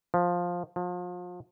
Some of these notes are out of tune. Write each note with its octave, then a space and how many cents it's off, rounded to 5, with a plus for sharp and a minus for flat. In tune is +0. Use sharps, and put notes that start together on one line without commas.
F3 +10
F3 +35